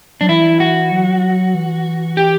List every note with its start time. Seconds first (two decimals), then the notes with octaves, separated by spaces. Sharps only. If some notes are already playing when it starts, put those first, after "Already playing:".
0.21 F#3 D4
0.29 E3 E4
0.60 F#4
0.92 F#3
1.54 E3
2.17 G4